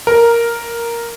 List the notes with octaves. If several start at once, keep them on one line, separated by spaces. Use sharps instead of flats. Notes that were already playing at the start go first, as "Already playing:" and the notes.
A#4